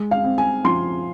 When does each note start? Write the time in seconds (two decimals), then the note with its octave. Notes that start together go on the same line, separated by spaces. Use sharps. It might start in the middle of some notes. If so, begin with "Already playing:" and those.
Already playing: G#3
0.11 F5
0.24 C4
0.38 G#5
0.65 F3 C6